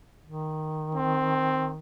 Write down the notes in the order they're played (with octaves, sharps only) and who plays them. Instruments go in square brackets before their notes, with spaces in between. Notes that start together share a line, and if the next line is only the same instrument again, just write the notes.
[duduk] D#3
[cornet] C4